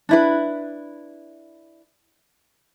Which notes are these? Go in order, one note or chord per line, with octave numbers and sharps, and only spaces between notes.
D4 E4 B4